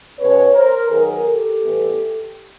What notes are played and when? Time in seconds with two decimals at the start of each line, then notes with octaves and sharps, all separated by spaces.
0.18 B2 G#3 C#4 B4 C#5
0.55 A#4 C5
0.89 D#3 F#3 B3 G#4 A#4
1.25 G4 A4
1.60 A2 E3 G3 B3